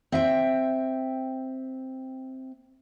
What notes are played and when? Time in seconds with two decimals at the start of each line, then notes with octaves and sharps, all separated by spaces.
0.12 C4 E5 G5